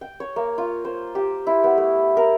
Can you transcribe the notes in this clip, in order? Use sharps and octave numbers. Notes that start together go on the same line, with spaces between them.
G5
C#5
A#3
F4
C5
G4
E4
B3
A3
A#4